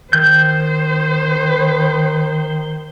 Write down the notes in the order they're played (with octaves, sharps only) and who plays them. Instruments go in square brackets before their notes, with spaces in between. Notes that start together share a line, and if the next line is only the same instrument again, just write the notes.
[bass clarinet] D#3 [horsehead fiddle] C5 [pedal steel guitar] G6